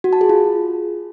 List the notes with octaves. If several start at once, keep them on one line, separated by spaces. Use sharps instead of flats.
F#4
A5
G#4
F4